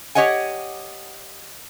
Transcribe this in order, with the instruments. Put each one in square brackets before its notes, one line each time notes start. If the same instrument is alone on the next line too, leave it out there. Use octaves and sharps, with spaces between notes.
[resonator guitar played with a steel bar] G4 C#5 D#5 F#5 G#5